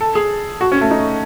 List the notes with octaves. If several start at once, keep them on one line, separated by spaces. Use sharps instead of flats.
A4
G#4
F#4
C#4
A3
D#4